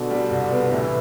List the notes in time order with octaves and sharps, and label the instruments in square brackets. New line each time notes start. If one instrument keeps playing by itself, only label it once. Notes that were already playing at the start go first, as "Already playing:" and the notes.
Already playing: [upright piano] B2 [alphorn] D3
[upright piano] G3
C2
B3
[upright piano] A2 [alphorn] E3